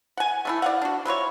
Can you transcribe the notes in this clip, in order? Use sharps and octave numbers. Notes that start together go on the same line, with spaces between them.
F#5 G#5
A3 D4 E4
D5 F5 F#5
D4 F#4
F#3 E4 F4 C#5